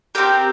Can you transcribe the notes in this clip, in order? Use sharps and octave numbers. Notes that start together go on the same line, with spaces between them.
C4 G4 A#4